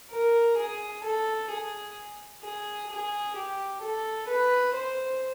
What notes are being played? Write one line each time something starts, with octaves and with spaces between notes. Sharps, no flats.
A#4
G#4
A4
G#4
G#4
G#4
G4
A4
B4
C5